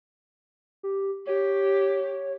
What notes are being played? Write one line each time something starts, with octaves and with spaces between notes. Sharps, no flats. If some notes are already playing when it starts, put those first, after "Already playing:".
G4
G4 C#5